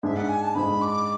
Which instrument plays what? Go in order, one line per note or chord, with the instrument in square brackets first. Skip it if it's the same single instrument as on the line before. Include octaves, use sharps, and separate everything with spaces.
[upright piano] G#2 G#3 D4 [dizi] E5
[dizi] F#5
G#5
A5
[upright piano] G#2 G#3 D4 [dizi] B5
[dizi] D6